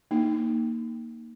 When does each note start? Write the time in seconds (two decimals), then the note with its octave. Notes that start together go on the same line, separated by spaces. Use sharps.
0.11 A#3 D#4